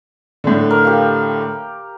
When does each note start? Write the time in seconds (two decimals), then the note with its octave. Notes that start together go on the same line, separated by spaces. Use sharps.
0.44 A2 D3
0.71 A#4 D6
0.85 G4 F5